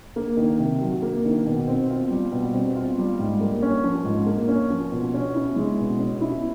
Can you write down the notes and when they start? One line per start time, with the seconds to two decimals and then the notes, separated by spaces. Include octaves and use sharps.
0.16 A#3
0.37 D#3
0.59 C3
0.81 F#3
1.02 A#3
1.25 D#3
1.46 B2
1.67 C4
1.89 F4
2.10 G3
2.32 B2
2.53 C4
2.75 F4
2.98 G3
3.19 G#2
3.41 A#3
3.62 C#4
3.83 F3
4.05 G#2
4.26 A#3
4.48 C#4
4.70 F3
4.91 B2
5.14 C#4
5.34 E4
5.56 G#3
5.79 B2
5.99 C#4
6.21 E4